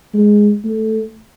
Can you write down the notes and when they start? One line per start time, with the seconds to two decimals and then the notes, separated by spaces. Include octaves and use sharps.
0.14 G#3
0.64 A3